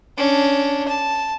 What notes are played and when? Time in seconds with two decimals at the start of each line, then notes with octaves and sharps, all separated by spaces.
0.18 C#4 D4
0.88 A5